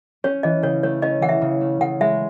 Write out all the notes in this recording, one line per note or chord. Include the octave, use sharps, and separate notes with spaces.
C#4 C#5
E3 D#5
C#3 C#5
A3 C#5
C#4 D#5
E3 F#5
E5
C#3
A3
C#3 F#5
G#3 E5